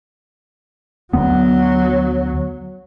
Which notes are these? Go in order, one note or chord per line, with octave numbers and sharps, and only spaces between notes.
D2 F#3 B3